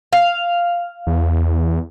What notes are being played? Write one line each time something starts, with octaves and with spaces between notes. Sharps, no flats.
F5
E2